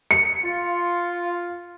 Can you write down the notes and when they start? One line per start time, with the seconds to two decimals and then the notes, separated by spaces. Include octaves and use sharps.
0.11 C#7
0.44 F4